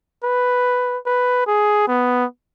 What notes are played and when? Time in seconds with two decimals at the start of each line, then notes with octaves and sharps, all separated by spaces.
0.24 B4
1.06 B4
1.47 G#4
1.88 B3